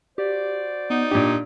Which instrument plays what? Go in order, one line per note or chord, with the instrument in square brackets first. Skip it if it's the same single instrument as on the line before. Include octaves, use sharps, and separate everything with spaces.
[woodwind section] F#4 C5 D5 [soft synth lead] G4
[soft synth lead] B3 [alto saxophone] D#4
[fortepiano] A#2 G4 [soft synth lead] D4